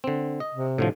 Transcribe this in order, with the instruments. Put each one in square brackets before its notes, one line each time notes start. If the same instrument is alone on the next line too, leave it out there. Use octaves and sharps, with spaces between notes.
[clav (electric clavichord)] D3 C4
D#5
[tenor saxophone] C3
[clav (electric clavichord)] A2 D3 F3